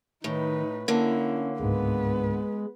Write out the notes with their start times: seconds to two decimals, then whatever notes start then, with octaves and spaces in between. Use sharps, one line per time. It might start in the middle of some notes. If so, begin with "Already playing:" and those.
0.24 A2 D#3 D#4 B4
0.88 D3 A#3 C#4 E4
1.60 C#2 G#2 G#3 B3 B4